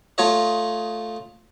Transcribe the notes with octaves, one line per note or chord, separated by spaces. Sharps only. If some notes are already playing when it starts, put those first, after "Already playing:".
A3 F4 C#5 D#5